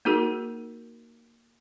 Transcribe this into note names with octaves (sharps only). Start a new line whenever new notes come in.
A#3 D#4 F#4 G#4 A#4